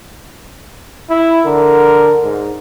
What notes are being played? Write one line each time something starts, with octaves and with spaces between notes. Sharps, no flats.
E4
D3 A#4
G#2